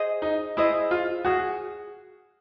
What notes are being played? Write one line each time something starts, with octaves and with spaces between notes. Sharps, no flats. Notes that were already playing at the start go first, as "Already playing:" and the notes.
Already playing: G#4 C5 D#5
D#4
E4 G#4 C5 D#5
F4
F#4 G#4